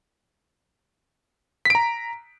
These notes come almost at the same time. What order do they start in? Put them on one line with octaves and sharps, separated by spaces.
B6 D7 A#5